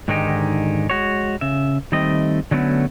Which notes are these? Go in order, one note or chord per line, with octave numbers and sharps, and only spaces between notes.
G#2 D3 D#3 G#3 D#4 G4
G#3 F#4 C#5
C#3 E5
D#3 G3 A3 C4 D#5
D3 F#3 A3 B3 C#4